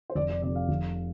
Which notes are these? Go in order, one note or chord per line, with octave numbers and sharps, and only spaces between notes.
C5
F1 D5
D5
F2 C3 D5
F5
F1